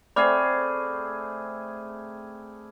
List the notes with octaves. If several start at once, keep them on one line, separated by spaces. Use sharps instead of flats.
A3 C4 G#4 D5 B5 D6 F6